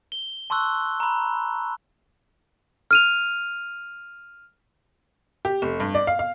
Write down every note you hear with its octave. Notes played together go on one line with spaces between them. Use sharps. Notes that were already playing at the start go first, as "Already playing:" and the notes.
G7
A5 C6 C#6 E6 F#6
A#5 B5
F6 D#7 F7
G4
F1
G2
D5
F5
F5